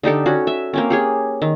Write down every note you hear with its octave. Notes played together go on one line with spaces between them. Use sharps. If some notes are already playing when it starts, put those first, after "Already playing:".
D3 D#4 G4 A4
C#4 F#4
E5
A#3 C4 C#4
G4 G#4 C#5
D#3